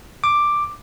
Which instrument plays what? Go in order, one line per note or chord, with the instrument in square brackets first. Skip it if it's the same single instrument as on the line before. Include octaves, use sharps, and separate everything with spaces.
[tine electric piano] D6